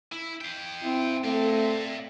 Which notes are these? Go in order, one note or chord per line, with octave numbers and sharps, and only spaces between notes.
E4
F5 G5
C4 E4
A3 C4 D5 F5